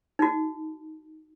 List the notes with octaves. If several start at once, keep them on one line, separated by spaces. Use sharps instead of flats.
D#4 F#4